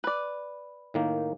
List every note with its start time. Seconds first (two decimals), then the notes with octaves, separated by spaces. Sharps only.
0.04 B4 D5
0.94 A2 D#3 A#3